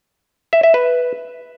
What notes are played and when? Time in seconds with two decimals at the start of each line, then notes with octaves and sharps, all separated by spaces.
0.53 E5
0.63 E5
0.74 B4